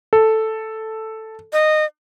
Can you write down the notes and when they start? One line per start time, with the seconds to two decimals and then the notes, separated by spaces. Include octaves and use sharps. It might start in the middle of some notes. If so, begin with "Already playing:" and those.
0.13 A4
1.53 D#5